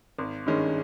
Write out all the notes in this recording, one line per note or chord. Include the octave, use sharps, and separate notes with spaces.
G#1
G2 D#3 G#3 C#4